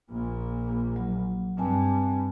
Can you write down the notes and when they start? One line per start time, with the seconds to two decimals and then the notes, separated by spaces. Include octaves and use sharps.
0.11 A#1 A#2
0.96 F#3
1.58 G2 C4 G#5 A5